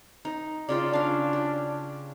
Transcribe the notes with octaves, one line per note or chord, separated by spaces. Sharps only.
D#4
C#3 F4 D5 G5
C#4 D4 F5
G4